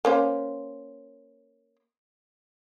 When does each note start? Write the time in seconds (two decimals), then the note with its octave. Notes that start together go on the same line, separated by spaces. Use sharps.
0.05 A#3 C#4 C5